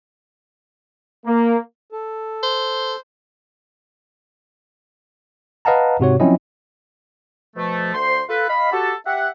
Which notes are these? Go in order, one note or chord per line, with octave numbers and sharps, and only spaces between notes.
A#3
A4
C5
B4 D#5 F5 F#5 A5 A#5
G#2 C3 F#4 C#5
F3 F#3 C4 C#4 E4 D#5
B2 F3 A3
D2 C5 C6
F4 A4 B4
D#5 F5 B5
F#4 G4 A4 A5
G4 E5 F#5